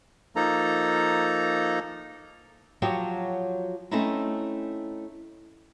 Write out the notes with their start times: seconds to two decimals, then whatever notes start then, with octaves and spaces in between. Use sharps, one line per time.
0.36 F3 A#3 D#4 A4 A#5
2.82 F3 F#3 F#4 G4 C#5 G5
3.91 A3 C4 C#4 D#4 E4